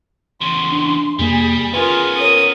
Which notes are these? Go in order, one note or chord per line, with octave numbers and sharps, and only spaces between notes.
E2 C#3 C6
D4
F2 C3 G3 A#3 G#4
B3 C#4 F4 G#4 A#4 B4
A#4 C#5 D#6